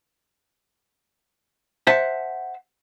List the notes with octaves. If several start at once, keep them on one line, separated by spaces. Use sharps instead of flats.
C5 E5 F#5 A5